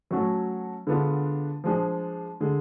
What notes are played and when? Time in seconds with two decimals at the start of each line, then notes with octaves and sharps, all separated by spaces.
0.11 F#3 A3 C#4 F#4 A4
0.87 D3 G#3 B3 D4 F4
1.64 F3 G#3 D4 G#4
2.40 D3 G#3